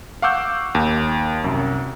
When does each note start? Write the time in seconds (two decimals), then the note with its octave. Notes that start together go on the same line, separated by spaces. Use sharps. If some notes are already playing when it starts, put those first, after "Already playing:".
0.22 F5 F#5 C#6 D6 E6 G6
0.75 D#2
1.44 C2 F#2